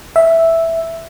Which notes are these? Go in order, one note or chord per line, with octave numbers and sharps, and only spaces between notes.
E5